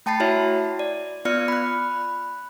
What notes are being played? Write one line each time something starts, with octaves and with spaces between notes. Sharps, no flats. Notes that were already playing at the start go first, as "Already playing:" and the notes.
A3 G5 A5 B5 A6 C7
E4 F#4 C#5 E5
D5
B3 F4 D5 F6 C#7
B5 F#6